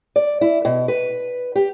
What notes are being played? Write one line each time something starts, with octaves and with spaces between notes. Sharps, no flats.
D5
E4
B2
B4
G4